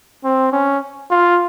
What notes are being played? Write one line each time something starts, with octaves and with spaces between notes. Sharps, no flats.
C4
C#4
F4